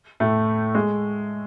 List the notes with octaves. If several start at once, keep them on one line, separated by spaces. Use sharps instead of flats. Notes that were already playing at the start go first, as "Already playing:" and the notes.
A2 A3
G#3